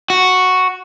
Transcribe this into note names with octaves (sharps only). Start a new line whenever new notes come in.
F#4